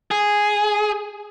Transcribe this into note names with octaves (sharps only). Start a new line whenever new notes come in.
G#4